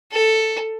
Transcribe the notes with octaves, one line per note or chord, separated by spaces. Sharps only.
A4